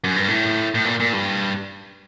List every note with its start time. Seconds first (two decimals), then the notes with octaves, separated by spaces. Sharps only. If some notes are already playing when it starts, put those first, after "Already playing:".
0.04 F#2
0.16 G2
0.28 A2
0.74 A2
0.85 A#2
1.00 A#2
1.13 G2